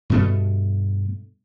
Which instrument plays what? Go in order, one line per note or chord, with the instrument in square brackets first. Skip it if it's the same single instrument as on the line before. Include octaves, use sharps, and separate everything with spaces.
[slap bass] G2 B2 A3